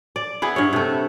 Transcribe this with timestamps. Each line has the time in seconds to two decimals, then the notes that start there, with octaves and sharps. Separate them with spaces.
0.16 D5
0.42 B3 E4 G#4
0.56 G2 C#5
0.73 C3 A3